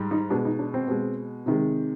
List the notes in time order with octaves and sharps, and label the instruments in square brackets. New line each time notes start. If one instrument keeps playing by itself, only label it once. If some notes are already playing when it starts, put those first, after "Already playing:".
Already playing: [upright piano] G#2 G3
D#4
B2 G#3 D4
D#4
D4
C4
B2 G#3
C3 D#3 G#3